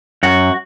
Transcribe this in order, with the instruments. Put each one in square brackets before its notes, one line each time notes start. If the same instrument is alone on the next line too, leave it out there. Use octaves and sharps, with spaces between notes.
[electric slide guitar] F#2 F#4